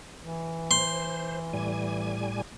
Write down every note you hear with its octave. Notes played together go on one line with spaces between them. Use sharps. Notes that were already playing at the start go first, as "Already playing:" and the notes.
E3
C5 C6
A2 G3 G#5